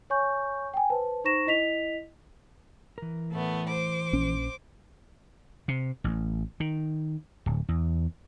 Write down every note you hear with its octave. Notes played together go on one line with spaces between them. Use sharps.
C#5 G#5 C#6 G6
G5 G#5
B4 C5 A5
D#4 C5 A#5 C#6 A#6 E7
E4 D#5 B6 F7
E3 A#4
A2 A3 B3
C5 D6
A#1 C#4
C3
A1
D#3
D1
E2